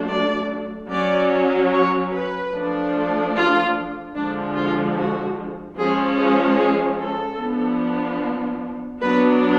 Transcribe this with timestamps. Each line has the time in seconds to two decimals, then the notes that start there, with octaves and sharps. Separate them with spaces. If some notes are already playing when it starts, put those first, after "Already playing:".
Already playing: F#3 A3 D4
0.10 D5
0.91 F#3 C#4 D5
1.73 C#5
2.13 B4
2.54 F3 A3 D4
3.35 F4
4.15 D3 F3 G#3 D4
4.56 F4
4.96 F#4
5.77 F3 G#3 C#4 G#4
6.18 G#4
6.58 G#4
6.99 A4
7.39 F3 B3 D4
9.01 F#3 B3 D4 B4